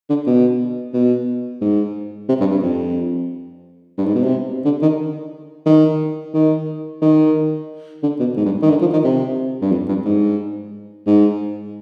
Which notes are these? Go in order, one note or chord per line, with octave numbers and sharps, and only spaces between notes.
D3
B2
B2
G#2
C3
G2
G2
F2
G2
G#2
B2
C3
D3
D#3
D#3
D#3
D#3
D3
B2
G#2
G2
D#3
D3
F3
D#3
C3
G2
F2
G2
G#2
G#2